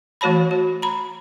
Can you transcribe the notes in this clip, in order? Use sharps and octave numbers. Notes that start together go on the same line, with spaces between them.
E3 A3 F#4 C#5 A5 B5
F#4
A#5 B5